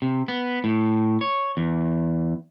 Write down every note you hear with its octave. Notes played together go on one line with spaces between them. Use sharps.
C3
B3
A2
C#5
E2